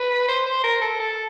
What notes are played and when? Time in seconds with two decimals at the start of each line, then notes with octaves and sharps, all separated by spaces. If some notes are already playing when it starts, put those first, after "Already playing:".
Already playing: B4
0.28 C5
0.46 C5
0.64 A#4
0.81 A4
1.00 A4